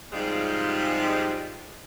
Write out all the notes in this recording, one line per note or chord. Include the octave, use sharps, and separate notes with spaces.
G#2 C3 F3 G3 G#3 F4